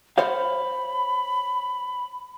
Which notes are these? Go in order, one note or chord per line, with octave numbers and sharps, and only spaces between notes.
C5 C#5 F5 B5